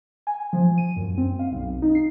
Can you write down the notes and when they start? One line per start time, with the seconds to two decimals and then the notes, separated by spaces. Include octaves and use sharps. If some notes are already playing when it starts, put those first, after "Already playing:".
0.27 G#5
0.53 F3
0.78 D#7
0.96 F#2
1.18 C4
1.39 F5
1.52 B1
1.82 D#4
1.95 C7